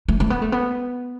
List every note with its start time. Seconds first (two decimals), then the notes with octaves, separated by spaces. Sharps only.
0.08 A3
0.20 A3
0.30 B3
0.42 A3
0.52 B3